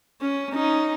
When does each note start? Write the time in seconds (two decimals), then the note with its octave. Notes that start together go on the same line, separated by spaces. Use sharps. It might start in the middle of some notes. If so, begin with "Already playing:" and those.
0.21 C#4
0.53 C#4 D#4